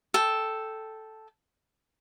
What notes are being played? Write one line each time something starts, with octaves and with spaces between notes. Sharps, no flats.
A4 G5